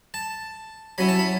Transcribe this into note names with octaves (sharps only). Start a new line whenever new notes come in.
A5
F#3 C#4 E4 B5
A5
B5